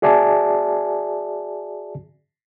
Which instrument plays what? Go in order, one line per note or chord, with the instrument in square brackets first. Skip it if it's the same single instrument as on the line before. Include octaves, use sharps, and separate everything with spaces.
[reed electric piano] F#4 G#4 D5 E5 G#5 A5